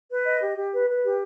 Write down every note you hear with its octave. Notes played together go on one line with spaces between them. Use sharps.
B4
D#5
G4
G4
B4
B4
G4